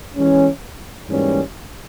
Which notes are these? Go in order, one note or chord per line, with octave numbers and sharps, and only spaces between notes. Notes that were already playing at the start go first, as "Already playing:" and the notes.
E3 G#3 C#4
G#2 E3 G3 A#3 C#4